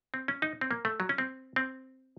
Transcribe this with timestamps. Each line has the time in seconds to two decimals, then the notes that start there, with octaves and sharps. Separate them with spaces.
0.14 C4
0.28 C#4
0.42 D#4
0.61 C4
0.71 A#3
0.85 A3
1.00 F#3
1.09 C#4
1.18 C4
1.56 C4